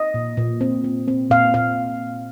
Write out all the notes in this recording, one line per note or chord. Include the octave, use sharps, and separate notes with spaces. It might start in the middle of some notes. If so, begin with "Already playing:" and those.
Already playing: D#5
A#2
A#2
C4
C4
C4
A#2 F5
A#2 F5